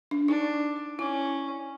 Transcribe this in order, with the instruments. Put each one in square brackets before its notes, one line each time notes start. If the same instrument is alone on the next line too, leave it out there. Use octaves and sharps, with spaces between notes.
[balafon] D4
[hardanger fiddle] D4 [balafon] D#4
[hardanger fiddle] C#4 [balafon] E4